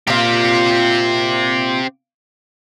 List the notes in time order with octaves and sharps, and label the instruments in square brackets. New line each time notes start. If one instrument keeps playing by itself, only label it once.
[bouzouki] A#2 F4 [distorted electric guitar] C4 G4